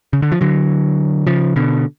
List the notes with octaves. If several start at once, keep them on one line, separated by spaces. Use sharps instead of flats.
C#3
D3
F3
D3 F#3
C#3 F3
B2 D3